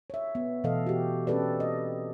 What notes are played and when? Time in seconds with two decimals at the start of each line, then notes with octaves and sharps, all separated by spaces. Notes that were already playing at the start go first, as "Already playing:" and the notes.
0.10 C#5 E5
0.35 B3
0.64 B2 E3 A3 A4 D#5 F5
0.87 F#4 G4
1.27 C4 C#4 G4 A4 B4 D5
1.60 D#5